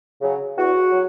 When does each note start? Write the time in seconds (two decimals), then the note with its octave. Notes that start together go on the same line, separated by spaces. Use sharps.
0.22 C#3 F#3
0.58 E2 F#4
0.93 F#3